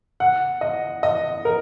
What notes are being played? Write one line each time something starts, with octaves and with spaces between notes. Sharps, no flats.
F#5
D#5
D#5
A#4